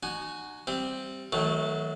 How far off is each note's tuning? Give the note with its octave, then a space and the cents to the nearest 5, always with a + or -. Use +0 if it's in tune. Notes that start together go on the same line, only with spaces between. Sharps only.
D#4 -40 F#4 +0 G#5 +10
G3 +0 C4 +0 E5 +35
D#3 +40 F#3 +0 A3 +0